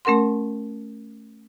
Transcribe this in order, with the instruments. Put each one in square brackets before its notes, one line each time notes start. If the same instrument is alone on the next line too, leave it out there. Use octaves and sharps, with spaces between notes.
[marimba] A3 C#4 A#4 F#5 C6